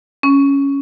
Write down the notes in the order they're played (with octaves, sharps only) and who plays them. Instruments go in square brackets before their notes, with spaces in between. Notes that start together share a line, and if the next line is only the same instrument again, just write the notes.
[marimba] C#4